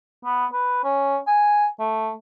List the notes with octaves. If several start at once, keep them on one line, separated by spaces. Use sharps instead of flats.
B3
B4
C#4
G#5
A3